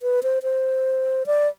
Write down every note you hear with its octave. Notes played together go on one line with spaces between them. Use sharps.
B4
C5
C5
D5